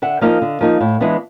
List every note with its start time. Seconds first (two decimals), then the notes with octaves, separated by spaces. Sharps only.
0.02 D3 E5 F#5
0.21 F3 A#3 D#4 D#5 F5
0.42 D3
0.61 F3 A#3 D#4
0.80 A2
1.01 E3 G#3 B3 D4